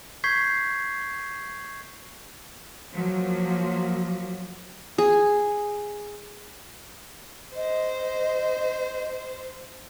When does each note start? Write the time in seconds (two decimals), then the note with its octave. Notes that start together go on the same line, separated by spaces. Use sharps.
0.24 C#6 G6 G#6 B6 C7
2.91 F3 F#3 A#3
4.98 G#4
7.56 C5 D#5